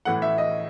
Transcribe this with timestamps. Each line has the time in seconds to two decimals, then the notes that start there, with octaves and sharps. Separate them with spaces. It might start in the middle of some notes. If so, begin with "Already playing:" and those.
0.05 A2 E3 A3 F#5
0.22 E5
0.38 D#5